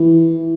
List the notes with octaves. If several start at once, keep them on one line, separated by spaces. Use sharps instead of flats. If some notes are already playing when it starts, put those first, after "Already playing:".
Already playing: E3